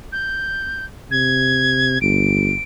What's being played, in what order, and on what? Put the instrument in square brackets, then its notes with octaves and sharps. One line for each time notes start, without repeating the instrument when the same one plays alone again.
[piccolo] G6
[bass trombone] C3 [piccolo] G#6
[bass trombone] G1 [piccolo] D7